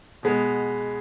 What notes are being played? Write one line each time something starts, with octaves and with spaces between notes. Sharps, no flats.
B2 G#3 B3